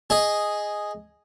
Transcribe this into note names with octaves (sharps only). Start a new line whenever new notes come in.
G#4 D#5